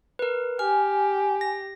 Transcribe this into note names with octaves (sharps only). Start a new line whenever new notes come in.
A#4 B4
G4 G#5 F6
A#6